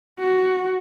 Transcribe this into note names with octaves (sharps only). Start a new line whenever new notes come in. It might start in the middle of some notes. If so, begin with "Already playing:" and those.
F#4